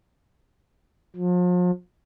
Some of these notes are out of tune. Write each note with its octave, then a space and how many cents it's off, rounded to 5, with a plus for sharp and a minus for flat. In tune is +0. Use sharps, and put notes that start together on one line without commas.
F3 +40